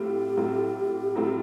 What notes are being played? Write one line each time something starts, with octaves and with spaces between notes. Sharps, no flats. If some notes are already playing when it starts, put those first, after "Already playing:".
Already playing: A2 F#3 A3 C4 F4 G4
A2 F#3 A3 C4 F4
A2 F#3 A3 C4 F4